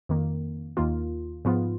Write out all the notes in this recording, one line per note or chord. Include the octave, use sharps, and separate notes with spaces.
F2 D#3 A#3
D#2 D#3 A#3 F4
G#2 F3 B3 F4